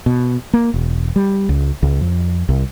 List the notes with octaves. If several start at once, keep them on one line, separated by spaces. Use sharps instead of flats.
B2
A#3
E1
G3
C#2
C#2
F2
C2